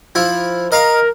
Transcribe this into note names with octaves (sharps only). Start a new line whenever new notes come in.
F3 E4
A#4 D#5 F5 A#5